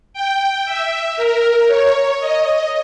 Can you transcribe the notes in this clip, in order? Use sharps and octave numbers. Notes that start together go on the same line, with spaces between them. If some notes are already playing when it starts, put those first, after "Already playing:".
G5
E5
A#4
C#5
D#5